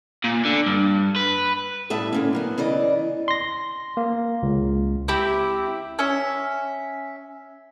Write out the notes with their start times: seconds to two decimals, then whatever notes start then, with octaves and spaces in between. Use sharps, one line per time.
0.24 A#2
0.45 D3
0.66 G2
1.16 B4
1.90 A2 G3 B3 E5 A5
2.13 D3 A#3 C#4
2.33 F#3 A#3 B3
2.58 C#3 E3 D5 D#5
3.28 C6 A#6
3.97 A#3
4.43 C#2
5.08 C4 E4 G4
5.99 C#4 E5